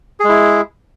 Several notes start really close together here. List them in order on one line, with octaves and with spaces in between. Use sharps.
G#4 G#3 E4